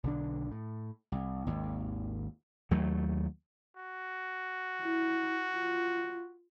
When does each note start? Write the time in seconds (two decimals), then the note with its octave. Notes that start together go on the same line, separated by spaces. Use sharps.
0.03 B1 D3 D4
0.51 A2
1.12 C2
1.46 G#1 D#2
2.71 D#2 F#3 A3
3.77 F#4
4.82 E4
5.55 F4